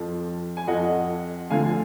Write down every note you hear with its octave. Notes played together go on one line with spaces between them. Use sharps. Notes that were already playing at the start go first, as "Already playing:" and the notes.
Already playing: F2 F3
G#5
F2 F3 D#5 F#5
D2 D3 F3 F5 G#5